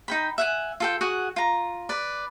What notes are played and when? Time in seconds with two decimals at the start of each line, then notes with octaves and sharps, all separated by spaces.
0.08 D#4 G5 B5
0.38 E5 F#5 G#5
0.80 F4 A4 G5
1.01 F#4 G#4 F#5
1.36 F4 A#5
1.89 B4 D5